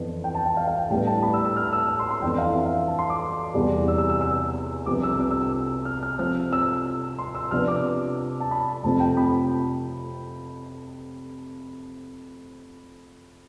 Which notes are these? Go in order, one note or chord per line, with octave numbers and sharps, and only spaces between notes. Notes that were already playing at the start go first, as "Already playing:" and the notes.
Already playing: F2 E3 B3 D4
G5
A5
G5
F5
F5
G5
A2 G3 B3 D4 G5
A5
B5
E6
E6
F6
E6
E6
C6
C6
F2 E3 B3 D4 G5
F5
E5
F5
A5
C6
D6
E2 C3 G3
E6
E6
E6
E6
C2 C3 F3 B3 D4 D6
E6
E6
E6
E6
F6
F6
C3 F3 C4 F6
E6
C6
E6
C3 F3 B3 D4 F6
D6
A5
B5
F2 C3 F3 A3 C4 A5
G5
B5